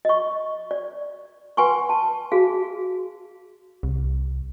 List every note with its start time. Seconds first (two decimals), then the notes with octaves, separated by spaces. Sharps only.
0.05 D#5 C#6
0.71 D5
1.57 B4 F#5 G#5 C6 C#6
1.89 A5
2.32 F#4 G#4 F5
3.83 C2